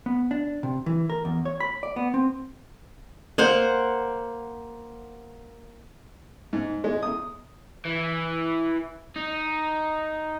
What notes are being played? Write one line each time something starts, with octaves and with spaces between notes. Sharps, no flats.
B3
D4
C3
E3
A#4
E2
C#5
B5
D5
B3
C4
A#3 C5 F#5
G#2
G#3
D#6
E3
D#4